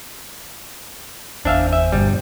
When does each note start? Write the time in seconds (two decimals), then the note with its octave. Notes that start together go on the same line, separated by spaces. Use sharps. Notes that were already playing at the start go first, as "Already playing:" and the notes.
1.45 G1 E2 D4 C5 E5 F5 G#5
1.73 E5
1.92 G2 B2 D3 G3